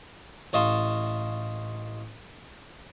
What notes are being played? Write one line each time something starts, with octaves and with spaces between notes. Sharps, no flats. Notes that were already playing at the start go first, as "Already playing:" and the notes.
A1 C#5 D#5 F5 A5 C6